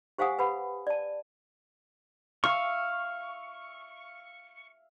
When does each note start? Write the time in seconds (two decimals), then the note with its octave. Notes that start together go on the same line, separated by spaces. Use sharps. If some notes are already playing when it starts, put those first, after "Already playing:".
0.18 G4 C5 F5 F#5 G#5 D#6
0.39 B4 F#5 B5
0.87 D5 A5
2.44 E5 F5 C#6